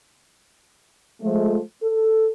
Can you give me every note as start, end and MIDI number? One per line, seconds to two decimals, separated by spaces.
1.22 1.60 53
1.22 1.60 56
1.22 1.60 57
1.83 2.30 69